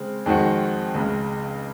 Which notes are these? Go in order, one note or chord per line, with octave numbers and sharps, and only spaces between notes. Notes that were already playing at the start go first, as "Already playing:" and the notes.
Already playing: C#3 G#3 C4
F2 D#3 G#3 C4 F#4
C#2 C#3 G#3